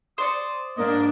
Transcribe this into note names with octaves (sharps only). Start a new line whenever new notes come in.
C5 D5 C#6 D#6
G#2 A#3 D4 D#5